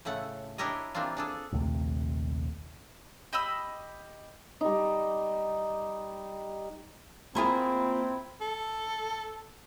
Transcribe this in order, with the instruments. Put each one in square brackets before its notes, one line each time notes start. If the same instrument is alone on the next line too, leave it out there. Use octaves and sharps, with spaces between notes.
[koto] A2 C#3 A3 F#5
D4 E4 G4 A#4 C#5 D#5
E3 G3 A#3 C4 D4 F4
D4 G#4 A4
[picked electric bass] A#1 D#2 C3 A3
[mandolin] G4 D#5 B5 E6
[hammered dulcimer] G3 D#4
[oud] A#3 F4 G#4 [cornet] C4 [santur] E4 A#5 B5
[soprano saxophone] A4